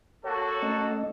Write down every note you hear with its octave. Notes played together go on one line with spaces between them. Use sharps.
A#3 F#4 A4 C#5
A3 C#4 D#5